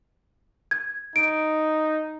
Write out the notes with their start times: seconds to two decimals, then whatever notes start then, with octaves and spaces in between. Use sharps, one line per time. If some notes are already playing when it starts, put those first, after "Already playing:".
0.71 G#6
1.16 D#4 D7